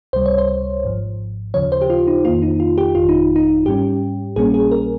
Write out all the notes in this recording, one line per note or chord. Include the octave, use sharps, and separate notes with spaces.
C#2 C3 G3 C5
C#5
C5
G#1 G#2 F3
D#2 C#3 F3 C#5
C5
G4
F4
D#4
F2 D#3 A#3 F4
D#4
F4
G4
G1 F2 D#3 F4
D#4
D#4
G#2 G3 C#4 G4
A#1 A#2 G3 A#3 C#4 G#4
G#4
A#4